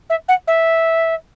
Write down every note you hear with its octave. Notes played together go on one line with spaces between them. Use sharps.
E5
F#5
E5